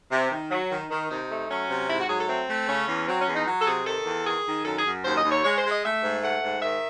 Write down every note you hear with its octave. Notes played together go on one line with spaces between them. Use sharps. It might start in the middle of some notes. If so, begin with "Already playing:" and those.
C3
D#3
F#3
D#3
D#3
C3 D#4
A3
F#3 C#4
C3
G#2 E4
F#4
F#3 G#4
A4
A3 C4
A3
C#3 C#4
E2
F#3 C4
C#4
E2
D#4
F#3
A4
C3 G#4
D#3 A4
E2
D#3 G#4
D#3
F#2 A4
G#4
F#2
D#2 C5
D#5
D#2
C#5
G#3 C#5
C5
G#3
D#5
A3 E5
G#2
A3 F#5
G#2
D#3 E5